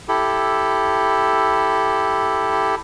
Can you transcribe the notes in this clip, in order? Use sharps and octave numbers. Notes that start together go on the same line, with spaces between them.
E4 G4 A4